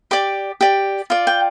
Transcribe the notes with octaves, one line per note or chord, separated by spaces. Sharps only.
G4 D5 D6
G4 D5
F4 D5
G5